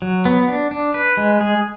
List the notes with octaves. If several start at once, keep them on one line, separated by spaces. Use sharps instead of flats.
F#3
B3
D4
D4
B4
G#3
G#4